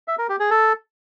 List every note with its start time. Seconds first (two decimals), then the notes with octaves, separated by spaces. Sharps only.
0.08 E5
0.18 A#4
0.29 G4
0.40 G#4
0.50 A4